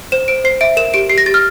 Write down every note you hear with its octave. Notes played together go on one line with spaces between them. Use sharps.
C5 E7
C5 D7
C5 C7
E5 D7
A#4 E7
G4 D7
G4 C7
A#6
G4 A6
F6